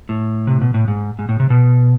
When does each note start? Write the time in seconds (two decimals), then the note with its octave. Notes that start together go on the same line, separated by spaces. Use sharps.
0.09 A2
0.47 C3
0.61 B2
0.74 A2
0.88 G#2
1.19 G#2
1.29 A2
1.40 C3
1.50 B2